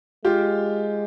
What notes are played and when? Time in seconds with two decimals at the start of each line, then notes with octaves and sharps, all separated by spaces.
0.25 G#3 F4 G4